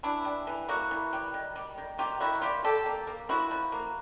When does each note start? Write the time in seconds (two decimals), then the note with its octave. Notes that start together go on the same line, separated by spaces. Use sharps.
0.03 E3 D4 E4
0.25 G3
0.47 E3
0.69 A#3 E4 F#4
0.91 E3
1.13 G3
1.34 D#3
1.56 G3
1.78 D#3
1.98 A#3 F4 G4
2.20 D#3 E4 F#4
2.42 G3 F4 G4
2.64 F3 G4 A4
2.86 A#3
3.07 A#3
3.29 F3 E4 F#4
3.51 F3
3.72 A#3